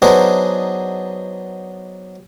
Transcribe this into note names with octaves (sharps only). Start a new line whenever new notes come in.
F#3 B3 D4 D#4 G#4 C5